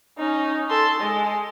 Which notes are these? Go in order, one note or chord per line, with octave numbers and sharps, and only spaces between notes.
C#4 D#4
A4 C6
G#3